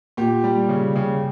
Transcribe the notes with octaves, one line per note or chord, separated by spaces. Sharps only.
A#2 G4
G3
C#3
C#3